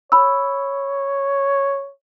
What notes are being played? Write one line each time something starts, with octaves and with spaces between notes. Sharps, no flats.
C#5 B5 E6